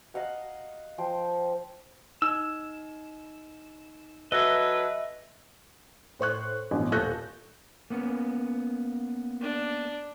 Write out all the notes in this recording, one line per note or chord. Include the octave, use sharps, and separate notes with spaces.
D#5 F5 F#5 A#5
F3 C5 G5
D#4 E6
F#3 A4 B4 D#5 E5 E6 A#6
A2 C5 C#6 F#6
A1 G2 B2 D3
D#1 A4 C#6 F#6 G6 A#6
A#3 B3 C#4
D4